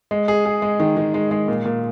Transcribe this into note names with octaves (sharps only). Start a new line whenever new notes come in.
G#3
G#4
G#4
G#3
D#3
D#3
G#3
G#3
A#2
A#2